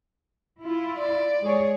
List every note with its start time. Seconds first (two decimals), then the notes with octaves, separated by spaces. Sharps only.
0.62 E4 F4
0.98 D5
1.40 G#3 G#4 C#5